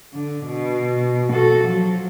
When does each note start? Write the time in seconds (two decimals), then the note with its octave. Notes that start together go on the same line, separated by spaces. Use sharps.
0.14 D3
0.47 B2
1.31 F#4 A4
1.65 F3 F#3